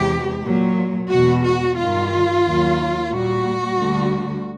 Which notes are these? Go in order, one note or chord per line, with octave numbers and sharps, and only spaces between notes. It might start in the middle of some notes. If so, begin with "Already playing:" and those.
Already playing: E2 C3 E3 G#3 G4
A#2 F#3
E2 B2 G#3 F#4
F#4
G2 D#3 G3 F4
D#2 D#3 F#3
A#2 G3 F#4
D2 D3 G3